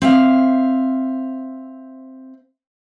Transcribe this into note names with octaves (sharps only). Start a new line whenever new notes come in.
C4 E5 F5